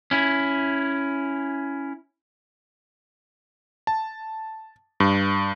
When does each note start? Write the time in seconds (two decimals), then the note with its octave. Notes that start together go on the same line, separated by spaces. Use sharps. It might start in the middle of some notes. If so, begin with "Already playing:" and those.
0.11 C#4 E4
3.87 A5
5.00 G2